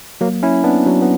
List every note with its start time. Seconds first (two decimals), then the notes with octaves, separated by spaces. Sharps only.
0.21 F#3 A#3
0.43 C#4 E4
0.64 B3 D4
0.86 F#3
1.02 B3